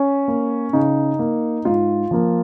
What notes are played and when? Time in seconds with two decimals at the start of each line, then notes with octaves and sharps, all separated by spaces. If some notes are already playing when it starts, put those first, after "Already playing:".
Already playing: C#4
0.28 A#3
0.73 C#3 D#4
1.19 A#3
1.65 G#2 F4
2.11 F3 A#3